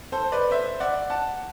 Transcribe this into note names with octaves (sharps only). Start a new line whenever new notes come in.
A4 C5
B4 D5
C5 E5
D5 F#5
F#5 A5